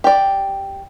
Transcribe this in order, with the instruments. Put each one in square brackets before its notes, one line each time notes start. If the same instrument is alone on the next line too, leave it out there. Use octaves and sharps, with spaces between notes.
[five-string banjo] G4 D5